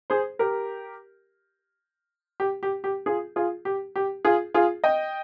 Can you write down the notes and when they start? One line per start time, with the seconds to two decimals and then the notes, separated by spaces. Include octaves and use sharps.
0.10 G#4 C5
0.39 G4 A#4
2.40 G4
2.63 G4
2.84 G4
3.06 F4 G#4
3.36 F4 G#4
3.65 G4
3.96 G4
4.25 F4 G#4
4.54 F4 G#4
4.84 D#5 G5